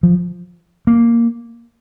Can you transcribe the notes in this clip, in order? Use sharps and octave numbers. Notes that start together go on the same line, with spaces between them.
F3
A#3